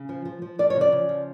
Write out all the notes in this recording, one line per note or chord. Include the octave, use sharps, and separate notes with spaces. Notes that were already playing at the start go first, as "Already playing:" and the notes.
Already playing: C#3
F3
F3
F3
F3 D5
C#5
C#3
D5
C#3
F3